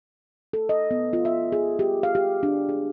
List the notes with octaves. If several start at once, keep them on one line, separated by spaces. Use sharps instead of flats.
A4
D#5
B3
F4
E5
G#4
G4
F5
G4
D4
G#4